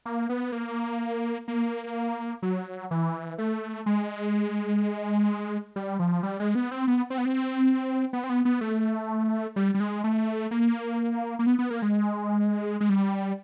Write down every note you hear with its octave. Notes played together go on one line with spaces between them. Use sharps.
A#3
B3
A#3
A#3
F#3
E3
A3
G#3
G3
F3
G3
G#3
B3
C4
B3
C4
B3
C4
B3
C4
B3
B3
A3
G3
G3
G#3
A3
A#3
A#3
B3
B3
A#3
G#3
G#3
G3